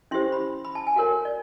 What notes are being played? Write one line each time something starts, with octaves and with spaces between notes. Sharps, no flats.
C#4 E4 G4 C5 C6
B5
B5
A5
G#5
F#4 A#4 C#5 F#5
D5